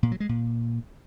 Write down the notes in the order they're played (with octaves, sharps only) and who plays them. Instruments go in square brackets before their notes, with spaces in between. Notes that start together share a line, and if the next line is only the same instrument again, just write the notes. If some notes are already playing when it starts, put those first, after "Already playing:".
[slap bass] A#2
F#3
G#3
A#2